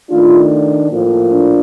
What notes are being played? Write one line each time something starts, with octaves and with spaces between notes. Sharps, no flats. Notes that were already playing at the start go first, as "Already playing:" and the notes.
D#3 A3 D4 F4
A2 F3 A#3
D4